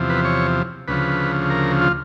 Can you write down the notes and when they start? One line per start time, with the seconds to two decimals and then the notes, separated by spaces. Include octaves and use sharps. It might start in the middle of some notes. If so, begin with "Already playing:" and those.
Already playing: E2 C3 F3
0.10 B4
0.25 C#5
0.88 D2 C#3 F3 B4
1.50 A#4
1.81 F4